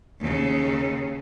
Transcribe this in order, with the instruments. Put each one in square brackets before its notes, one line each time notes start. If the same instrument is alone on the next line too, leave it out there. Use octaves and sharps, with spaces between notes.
[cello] D#2 C#3